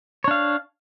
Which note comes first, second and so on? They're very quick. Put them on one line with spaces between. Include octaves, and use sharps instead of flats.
C#5 D4 F5